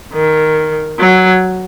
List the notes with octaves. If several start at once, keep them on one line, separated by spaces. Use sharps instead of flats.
D#3
F#3